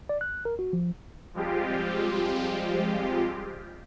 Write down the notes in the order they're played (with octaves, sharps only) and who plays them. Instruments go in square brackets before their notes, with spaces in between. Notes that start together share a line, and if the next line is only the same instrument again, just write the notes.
[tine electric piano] D5
F#6
A#4
F#4
F3
[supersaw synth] F3 G3 G#3 C4 F4 G4